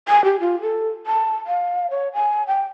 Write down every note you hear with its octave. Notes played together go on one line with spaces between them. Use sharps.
G#5
G4
F4
A4
A5
F5
C#5
G#5
G5